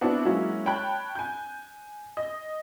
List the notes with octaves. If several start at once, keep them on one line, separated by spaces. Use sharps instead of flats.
B3 C4 D4 E4 F#4
F#3 G#3 A#3 C#4 E4 F#4
C#5 G5 A5 B5 F#6
G#5 G6
D#5